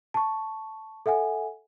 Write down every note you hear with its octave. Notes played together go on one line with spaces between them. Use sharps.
A5 C#6
A4 E5 F#5 G#5